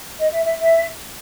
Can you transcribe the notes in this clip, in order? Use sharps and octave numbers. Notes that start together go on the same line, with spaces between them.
D#5
E5
E5
E5